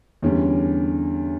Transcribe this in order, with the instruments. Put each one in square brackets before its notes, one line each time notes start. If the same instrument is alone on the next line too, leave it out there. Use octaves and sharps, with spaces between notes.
[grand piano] E2 D3 G3 C#4